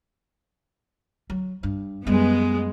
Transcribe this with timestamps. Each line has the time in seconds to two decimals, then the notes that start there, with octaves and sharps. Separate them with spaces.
1.30 F#3
1.63 G2
2.07 F#2 G3 G#3 B3